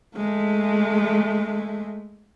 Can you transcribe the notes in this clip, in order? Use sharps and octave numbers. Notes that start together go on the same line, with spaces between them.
G#3 A3